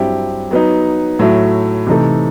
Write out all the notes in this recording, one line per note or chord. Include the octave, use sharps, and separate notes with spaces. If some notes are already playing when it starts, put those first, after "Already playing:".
Already playing: G2 F#3 C4 E4 G4
F#3 B3 D#4
A2 F#3 A3 E4
C3 E3 A3 D#4 A4